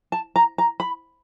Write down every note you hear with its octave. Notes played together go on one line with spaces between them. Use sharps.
A5
A#5
A#5
B5